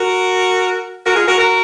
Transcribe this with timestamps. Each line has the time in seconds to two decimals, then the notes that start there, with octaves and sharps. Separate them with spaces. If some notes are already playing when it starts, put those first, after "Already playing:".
Already playing: F#4 A#4
1.05 F#4 A#4
1.16 F4 G#4
1.27 F#4 A#4
1.38 F#4 A#4